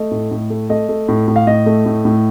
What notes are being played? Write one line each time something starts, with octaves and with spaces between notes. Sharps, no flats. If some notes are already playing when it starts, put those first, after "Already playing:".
Already playing: A3 D#5
A2
A2
A3
A3 D#5
A3
A2
A2
F5
A2 D#5
A3
A2
A2